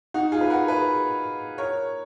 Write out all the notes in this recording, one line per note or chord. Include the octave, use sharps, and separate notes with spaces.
D#4 F#4
F4 G#4
B4
F#4 A#4
G#4 B4
A#4 C#5